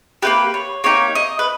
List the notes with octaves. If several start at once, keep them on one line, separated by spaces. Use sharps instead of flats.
A#3 D#4 G4 B4
C#5
A#3 D#4 G4 C#5
D#5
B4